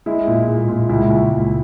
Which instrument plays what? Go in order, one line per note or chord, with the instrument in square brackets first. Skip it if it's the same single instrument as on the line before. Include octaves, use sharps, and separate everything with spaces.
[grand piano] G#3 E4
A#2
G#3
A#2
C#2 E4
C#2
C#2